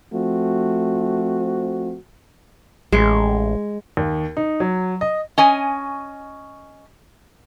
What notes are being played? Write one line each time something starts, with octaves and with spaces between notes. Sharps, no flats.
F3 A3 C4 F#4
A1 G#3
D#2
D#4
F#3
D#5
C#4 D#5 G#5